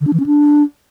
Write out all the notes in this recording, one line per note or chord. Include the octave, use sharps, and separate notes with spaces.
D3
D4
E3
C#4
D4